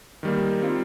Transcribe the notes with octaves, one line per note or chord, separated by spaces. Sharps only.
D#3 G3 A#3
G3 C4 F4